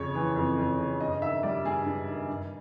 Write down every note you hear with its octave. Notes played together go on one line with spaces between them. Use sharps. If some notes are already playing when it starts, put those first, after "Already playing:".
Already playing: F2 C#3 C#5
E3
F2
F2
C#3
G2 D#5
D#3 E5
G3 D5
G2 G#4
G2
D#3
G2